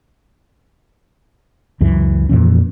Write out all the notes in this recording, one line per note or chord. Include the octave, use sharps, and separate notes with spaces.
C#2 F#2 E3
F2 A#2 E3 C#4